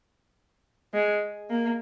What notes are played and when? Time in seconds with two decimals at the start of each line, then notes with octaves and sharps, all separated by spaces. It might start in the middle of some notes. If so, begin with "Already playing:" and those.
0.94 G#3
1.50 A#3